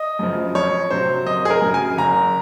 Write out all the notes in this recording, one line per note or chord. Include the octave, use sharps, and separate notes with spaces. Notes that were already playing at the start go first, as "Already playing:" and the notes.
Already playing: D#5
F#2 C#3 F3
F2 C#5
C3 F#3 C5
F#1 D#5
G#4
A#4
F#2 C#3
G#5
F#1 A#5